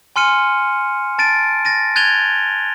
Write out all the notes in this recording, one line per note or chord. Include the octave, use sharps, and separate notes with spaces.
G#5 C6 F6 C#7 D#7
A5 A6 D7 D#7
A6 A#6 D#7
F#6 G#6 A6 D#7 F7 G7